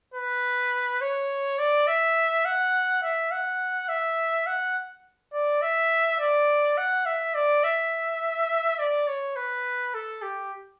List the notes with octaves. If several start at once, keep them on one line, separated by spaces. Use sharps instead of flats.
B4
C#5
D5
E5
F#5
E5
F#5
E5
F#5
D5
E5
D5
F#5
E5
D5
E5
D5
C#5
B4
A4
G4